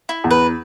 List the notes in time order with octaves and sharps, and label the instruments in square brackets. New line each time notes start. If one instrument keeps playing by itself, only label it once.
[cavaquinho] E4
[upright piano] E2
[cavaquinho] B4